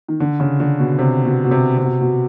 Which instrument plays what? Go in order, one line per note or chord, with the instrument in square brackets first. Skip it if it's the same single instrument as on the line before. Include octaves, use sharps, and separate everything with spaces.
[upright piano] D#3
D3
C#3
D3
B2
C3
B2
B2
C3
C3
B2
B2